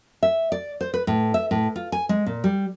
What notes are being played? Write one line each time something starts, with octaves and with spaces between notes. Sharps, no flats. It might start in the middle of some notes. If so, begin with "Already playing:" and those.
E5
D5
C5
B4
A2
E5
A2
F4
G#5
G#3
A#2
G3